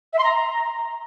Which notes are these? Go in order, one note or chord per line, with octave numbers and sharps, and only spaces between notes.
E5
C6
A#5